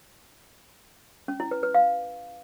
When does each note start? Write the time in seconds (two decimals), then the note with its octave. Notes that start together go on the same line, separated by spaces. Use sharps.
1.28 C#4
1.40 E4
1.51 B4
1.63 B4
1.74 F5